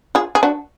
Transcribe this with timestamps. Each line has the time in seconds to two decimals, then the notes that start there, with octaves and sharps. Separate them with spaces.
0.15 F4 G#4
0.35 G#4
0.43 D4 F#4